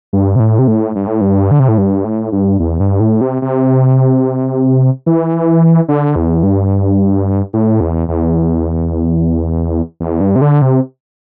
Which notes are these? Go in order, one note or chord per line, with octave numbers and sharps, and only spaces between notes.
G2
C3
A2
C3
A2
G2
A2
G2
D3
C3
A2
G2
A2
G2
E2
G2
A2
C3
C3
E3
D3
E2
G2
A2
E2
E2
E2
G2
C3
D3
C3